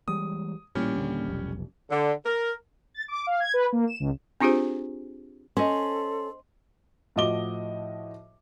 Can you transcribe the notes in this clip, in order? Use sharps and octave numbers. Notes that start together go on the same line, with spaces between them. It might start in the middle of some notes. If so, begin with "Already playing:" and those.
E3 G3 G#3 D#6
A1 A#2 E3 G3 C#4
D#2 A#2 D3
F1 B1
D3
A#4
A6
D6
F5
G#6
B4
A#3
E7
C#2
C4 D4 F4 G4 G#4 C5
C#4 A4 C5 D#5 C6
A2 F3 F#4 D#5 D6 G7